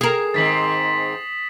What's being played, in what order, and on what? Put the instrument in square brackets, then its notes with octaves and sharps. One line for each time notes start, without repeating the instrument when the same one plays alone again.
[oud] G#4 A#4 [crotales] D#6 C7 E7
[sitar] G#2 D#3 C4 [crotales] A6 B6 F#7